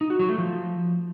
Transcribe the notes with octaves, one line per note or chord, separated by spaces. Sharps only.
D#4
F#4
F#3
A3
F3